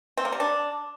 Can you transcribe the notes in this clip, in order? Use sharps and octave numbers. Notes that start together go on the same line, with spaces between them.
C4
A#3
G3
D4